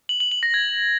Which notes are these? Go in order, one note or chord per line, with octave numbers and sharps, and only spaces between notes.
F#7
F#7
F#7
A#6
G#6